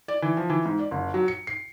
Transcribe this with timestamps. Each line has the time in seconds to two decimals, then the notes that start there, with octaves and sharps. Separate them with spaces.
0.08 D5
0.22 E3
0.37 F3
0.50 E3
0.66 G#2
0.79 D5
0.91 F#1
1.14 F#3
1.28 C#7
1.47 C7